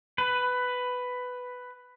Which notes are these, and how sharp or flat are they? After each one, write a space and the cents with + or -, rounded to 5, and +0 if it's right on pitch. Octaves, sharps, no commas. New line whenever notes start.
B4 +10